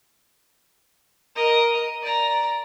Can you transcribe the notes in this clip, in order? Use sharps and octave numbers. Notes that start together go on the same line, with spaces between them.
A#4 D#5
D5 A#5